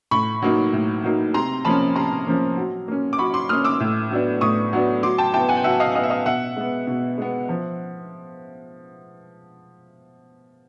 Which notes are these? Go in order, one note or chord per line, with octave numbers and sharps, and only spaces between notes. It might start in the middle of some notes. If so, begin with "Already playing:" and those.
A2 B5 C#6
F#3 A#3 D#4
A2
F#3 A#3 D#4
C3 A#5 C6
F3 A#3 C#4 A5 B5
C3 A#5 C6
F3 A#3 C#4
F#3
A#3 C#4
D6
F#3 B5 C#6
C6 D6
A#3 C#4 D#6 F6
D6 E6
A2
F#3 B3 D4
A2 C#6 D#6
F#3 B3 D4
F#3 C6 D6
G5 A5
B3 E4 G5 A5
F#5 G#5
G5
F#3 E5 F#5
D#5 F5
B3 E4 D#5 F5
E5
D#5 F5
B2 E5 F#5
G#3 B3
B2
G#3 B3
F3